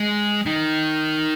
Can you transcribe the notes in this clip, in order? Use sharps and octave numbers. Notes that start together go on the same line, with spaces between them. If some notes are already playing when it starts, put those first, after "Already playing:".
Already playing: G#3
D#3